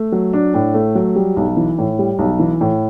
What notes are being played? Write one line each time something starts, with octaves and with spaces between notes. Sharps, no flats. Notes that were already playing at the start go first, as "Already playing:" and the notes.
Already playing: A3
F#3
D4
A2
A3
F#3
G3
B1
E3
A2
G3
B1
E3
A2